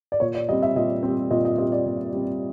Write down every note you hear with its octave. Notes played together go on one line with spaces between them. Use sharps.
D5
A#2 C#5
D5
G3 C4 D#5
E5
A#2 D#5
G3 C4
A#2 D#5
D#5
G3 C4 D#5
D5
A#2
G3 C4